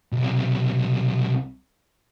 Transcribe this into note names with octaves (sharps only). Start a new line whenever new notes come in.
B1 C3